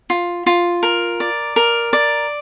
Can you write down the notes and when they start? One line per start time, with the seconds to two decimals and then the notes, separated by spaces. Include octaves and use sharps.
0.10 F4
0.46 F4
0.83 A#4
1.20 D5
1.56 A#4
1.93 D5